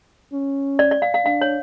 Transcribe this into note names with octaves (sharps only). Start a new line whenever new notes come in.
C#4
D5
D5
F5
F5
D4 F5
C#5